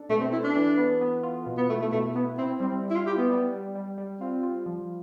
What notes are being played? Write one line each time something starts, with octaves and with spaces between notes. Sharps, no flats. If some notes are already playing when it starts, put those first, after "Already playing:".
Already playing: D4 A4
B2 A3
C4
E4 A4
D4
E3
B3
B3
F4
B2
B3
A3 E4
A3
B2 A3
B3 E4
C4 E4
G3 C4
G3
E4
F4
E4 G4
B3
G3
G3
G3
G3
C4 F4
F4
F3